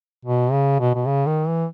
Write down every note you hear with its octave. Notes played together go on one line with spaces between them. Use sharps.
B2
C#3
B2
B2
C#3
D#3
E3